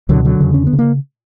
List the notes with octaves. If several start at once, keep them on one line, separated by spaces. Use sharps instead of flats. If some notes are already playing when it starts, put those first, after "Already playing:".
C#2 B2 D3 F#3
D3 F#3
E2 C#3
C#4
B3
C#3
A#3